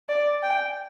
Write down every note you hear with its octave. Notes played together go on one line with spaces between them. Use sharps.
D5
G5